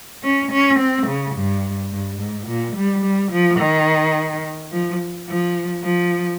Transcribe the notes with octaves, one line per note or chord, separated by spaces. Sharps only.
C#4
C#4
C4
C#3
G2
G2
G#2
A#2
G3
G3
F3
D#3
F3
F3
F3